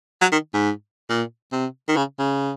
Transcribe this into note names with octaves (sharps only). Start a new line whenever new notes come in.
F#3
D#3
G#2
A#2
C3
D#3
C#3
C#3